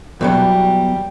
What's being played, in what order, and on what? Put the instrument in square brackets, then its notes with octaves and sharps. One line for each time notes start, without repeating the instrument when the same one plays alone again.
[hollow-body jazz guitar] E2 B2 F#3 [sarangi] G3